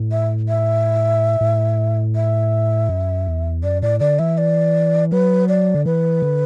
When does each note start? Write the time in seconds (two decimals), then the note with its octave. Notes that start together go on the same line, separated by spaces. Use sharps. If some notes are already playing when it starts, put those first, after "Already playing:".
Already playing: A2
0.12 E5
0.49 E5
1.41 A2
2.15 E5
2.89 F#2
3.27 E2
3.63 F#2 D5
3.82 A2 D5
4.00 D3 D5
4.19 E3 E5
4.38 D5
5.11 F#3 B4
5.48 D5
5.74 D3
5.86 E3 B4
6.22 D3